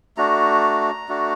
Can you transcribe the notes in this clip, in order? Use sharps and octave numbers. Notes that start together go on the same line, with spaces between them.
A3 D4 F#4 A#5
A3 D4 F#4